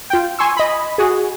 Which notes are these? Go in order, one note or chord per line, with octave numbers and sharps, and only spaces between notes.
F4 G5
G#5 C6 C#6 E6
D#5 B5
F#4 G#4